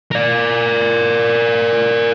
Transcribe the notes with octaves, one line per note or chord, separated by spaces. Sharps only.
A#4 D5